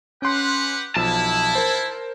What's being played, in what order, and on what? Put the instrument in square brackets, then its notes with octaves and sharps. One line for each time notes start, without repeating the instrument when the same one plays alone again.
[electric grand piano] C#4 C6 [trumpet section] G4 B4 F#5
[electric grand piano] B1 F3 [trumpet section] E4 [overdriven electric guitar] A5
[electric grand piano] A#4 C5